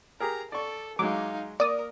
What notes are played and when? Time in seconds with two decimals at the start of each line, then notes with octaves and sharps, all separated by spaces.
0.20 G4 G#4 A#4 A#5
0.52 A4 D5 C#6
0.99 F#3 G#3 D#4 F5 D6
1.60 A#3 A#4 D5 D#6